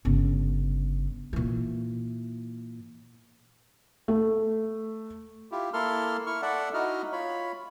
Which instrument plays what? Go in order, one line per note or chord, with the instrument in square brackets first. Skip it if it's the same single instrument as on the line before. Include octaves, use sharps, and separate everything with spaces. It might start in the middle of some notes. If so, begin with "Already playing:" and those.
[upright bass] G1 C#3
A#2 E3
[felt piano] A3
[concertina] E4 F4 G4
A#3 E4 A4 C6 F6
E4 C#6 F6
A4 D5 E5 F#5
D#4 E4 F#4 D#5 F6
F4 C#5 B5